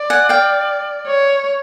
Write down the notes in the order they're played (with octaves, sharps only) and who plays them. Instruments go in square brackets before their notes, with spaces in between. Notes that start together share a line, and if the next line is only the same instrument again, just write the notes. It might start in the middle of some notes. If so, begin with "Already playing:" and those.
Already playing: [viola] D5
[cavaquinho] F#5 G#5
F5 G5
[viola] C#5